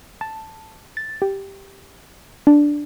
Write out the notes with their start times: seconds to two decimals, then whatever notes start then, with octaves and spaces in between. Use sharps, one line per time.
0.21 A5
0.97 A6
1.22 G4
2.47 D4